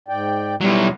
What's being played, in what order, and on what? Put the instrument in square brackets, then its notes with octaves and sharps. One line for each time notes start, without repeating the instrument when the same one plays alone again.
[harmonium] G#2 D5 G5
[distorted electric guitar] B2 F#3 [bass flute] G3 [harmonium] E4